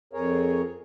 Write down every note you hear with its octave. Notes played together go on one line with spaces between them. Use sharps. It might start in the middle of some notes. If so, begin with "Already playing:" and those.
F2 G#4 A#4 C#5